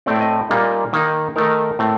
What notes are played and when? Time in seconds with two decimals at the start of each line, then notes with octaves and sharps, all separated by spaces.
0.06 A2 A3 C4 D5
0.21 D#5
0.49 A#2 G3 A#3 D#4
0.93 D#3 A#3 D#4
1.36 D#3 A3 D#4 A#4
1.79 A2 A3 C4